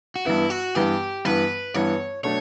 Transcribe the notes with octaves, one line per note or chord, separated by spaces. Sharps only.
F#4
G2 E3 B3 E4
F#4
G2 E3 B3 G4
G2 E3 B3 B4
G2 E3 B3 C#5
B2 F#3 A3 D4 C#5